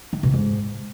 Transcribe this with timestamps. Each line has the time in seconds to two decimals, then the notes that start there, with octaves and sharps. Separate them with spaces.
0.13 D#3
0.23 B2
0.34 G#2